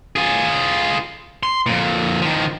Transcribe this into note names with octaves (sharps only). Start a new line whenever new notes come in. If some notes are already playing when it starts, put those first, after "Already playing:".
F4 G#4
C6
F2 A#2
D#3 F3